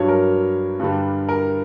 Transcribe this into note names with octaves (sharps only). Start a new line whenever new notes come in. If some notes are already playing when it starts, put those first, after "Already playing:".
Already playing: G2 F#3 C#5
A#4
G2 D3 G3
A#4